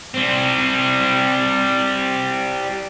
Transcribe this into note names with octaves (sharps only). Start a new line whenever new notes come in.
G3 C4